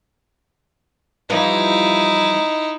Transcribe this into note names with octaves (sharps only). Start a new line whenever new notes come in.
E3 F3 G3 D#4 E4